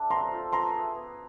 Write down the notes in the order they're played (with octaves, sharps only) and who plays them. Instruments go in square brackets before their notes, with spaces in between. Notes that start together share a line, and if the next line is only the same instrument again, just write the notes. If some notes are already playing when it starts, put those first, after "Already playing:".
Already playing: [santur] A3 D4
[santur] C4 [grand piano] A#5 C6
[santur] F4 A4 C5
[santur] B3 [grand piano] A#5 C6
[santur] E4 G#4 B4
B3